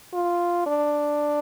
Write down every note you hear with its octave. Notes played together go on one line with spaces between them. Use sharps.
F4
D4